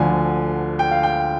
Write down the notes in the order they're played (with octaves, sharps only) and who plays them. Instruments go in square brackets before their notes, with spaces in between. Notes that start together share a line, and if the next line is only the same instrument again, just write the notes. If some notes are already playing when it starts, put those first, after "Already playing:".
Already playing: [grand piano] D2 D3 F3 G#5
G5
F5
G5